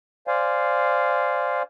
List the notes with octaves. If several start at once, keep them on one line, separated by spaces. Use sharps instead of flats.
C5 D5 F5 G#5